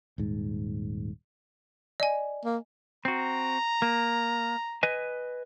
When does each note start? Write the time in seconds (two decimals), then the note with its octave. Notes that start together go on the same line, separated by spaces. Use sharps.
0.18 D#1 G#2
2.00 D5 D#5 G#5
2.45 A#3
3.05 C4 F#4 A#5
3.82 A#3
4.83 B4 D#5 G#5